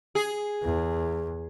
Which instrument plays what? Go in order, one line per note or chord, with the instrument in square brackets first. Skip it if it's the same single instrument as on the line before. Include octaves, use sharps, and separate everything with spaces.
[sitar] G#4
[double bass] E2